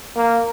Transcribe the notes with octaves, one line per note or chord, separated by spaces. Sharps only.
A#3